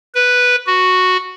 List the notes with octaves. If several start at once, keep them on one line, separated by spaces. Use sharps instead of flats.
B4
F#4